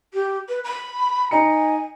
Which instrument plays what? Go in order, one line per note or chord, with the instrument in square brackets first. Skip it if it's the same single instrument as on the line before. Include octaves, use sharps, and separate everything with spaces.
[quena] G4
B4
B5
[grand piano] D#4 A#5 C#7 [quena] G#5